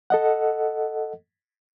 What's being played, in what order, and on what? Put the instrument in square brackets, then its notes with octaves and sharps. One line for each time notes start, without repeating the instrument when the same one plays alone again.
[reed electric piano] A4 D#5 F#5